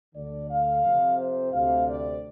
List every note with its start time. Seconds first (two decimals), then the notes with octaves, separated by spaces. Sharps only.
0.15 D2 D3 D5
0.50 F5
0.84 F2 C3
1.17 C5
1.52 D2 C3 F5
1.87 D5